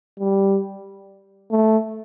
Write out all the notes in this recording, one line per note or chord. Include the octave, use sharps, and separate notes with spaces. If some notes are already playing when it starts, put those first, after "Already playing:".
G3
A3